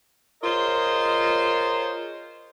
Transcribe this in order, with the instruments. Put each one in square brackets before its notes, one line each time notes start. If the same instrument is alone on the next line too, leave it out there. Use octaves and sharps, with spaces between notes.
[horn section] F4 G#4 A#4 C5 C#5 D#5